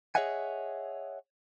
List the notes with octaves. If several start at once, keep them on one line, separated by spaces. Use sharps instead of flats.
G#4 C#5 D#5 E5 F#5 G#5